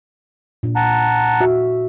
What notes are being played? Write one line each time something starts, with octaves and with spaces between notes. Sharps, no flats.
A#2 D4
F#5 A5 A#5
F#4 E5